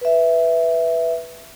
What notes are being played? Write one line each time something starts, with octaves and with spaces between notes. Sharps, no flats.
B4 E5